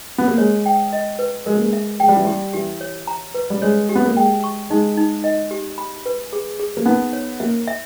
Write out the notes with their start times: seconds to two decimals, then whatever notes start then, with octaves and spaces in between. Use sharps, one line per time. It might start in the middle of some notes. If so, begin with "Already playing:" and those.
0.18 B3
0.28 A#3
0.38 G#3 C#5
0.66 G5
0.93 D#5
1.19 B4
1.46 G#3 A#4
1.54 A#3
1.62 G#3
1.73 E5
2.00 G#3 G5
2.08 G3
2.16 E3
2.25 G3 G4
2.53 E3 G4
2.81 C#5
3.07 A#5
3.34 B4
3.50 G3
3.62 G#3 C#5
3.89 G4
3.95 B3
4.05 A#3
4.16 G#3 G5
4.44 C#6
4.70 G#3 D#4
4.97 D#4
5.24 D#5
5.51 G4
5.78 B5
6.06 B4
6.33 G#4
6.60 G#4
6.77 A#3
6.86 B3 D#4
7.13 C#5
7.40 A#3 E5
7.68 E5